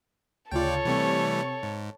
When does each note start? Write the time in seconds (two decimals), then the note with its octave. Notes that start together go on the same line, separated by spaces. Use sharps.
0.51 D2 C#3 F4 A4 C#5 D5 G5
0.85 C3 E3 G3 A3 C4 C#6
1.63 G#2